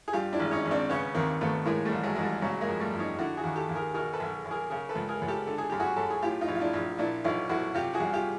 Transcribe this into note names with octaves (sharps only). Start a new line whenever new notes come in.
G#4
G2 F4 G4
D4 E4
G#1
C#4 D#4
G#1
C4 D4
C#3 B3 C#4
D#2 A#3 C4
D#2 A3 B3
A2 G#3 A#3
G3 A3
A1
F#3 G#3
A1 G#3
G3
C#3 F#3 G#3
G#3 A#3
F2
G3 A3
F2
C#4 D#4
D3 E4 F#4
F#4 G#4
D#2
G4 A4
D#2
G#4 A#4
B2 G#4 A#4
A4 B4
B1
B1
G#4 A#4
C#3 G#4 A#4
A4 B4
C#2
G#4 A#4
C#2
G4 A4
D3 A4
G#4
F#2 G4
F#4 G#4
F#2 A4
G#4
A2 F4 G4
D#4 F4
A#1
F4
D4 E4
A#1
A#2 D4 E4
B1 D#4 F4
B1 E4 F#4
C3 F4 G4
F#4 G#4
C2
F4 G4